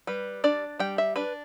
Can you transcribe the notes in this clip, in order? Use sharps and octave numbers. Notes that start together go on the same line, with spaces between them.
G3 B4
D4 D5
G3 G5
E5
D4 B4